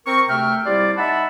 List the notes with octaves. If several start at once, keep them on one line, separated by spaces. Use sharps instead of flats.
C4 A#4 C#6
D2 C3 A3 E5 G5 F6
C3 G3 E4 F4 D5
D#4 E5 F#5 A5 B5